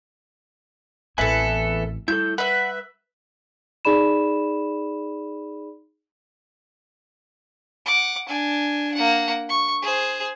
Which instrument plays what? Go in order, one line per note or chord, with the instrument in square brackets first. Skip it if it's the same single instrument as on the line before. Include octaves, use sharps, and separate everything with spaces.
[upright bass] A1 C4 [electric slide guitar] E2 E5 G#5 [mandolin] A4 B4
[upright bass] G3 [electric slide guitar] E4 F4 A4 [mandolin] G6
[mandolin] B4 E5 [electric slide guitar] F#5
[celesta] D#4 G#4 D5 B5 E7
[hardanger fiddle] F#5 D6
D4 G#5
A#3 F#5
C#6
G#4 C5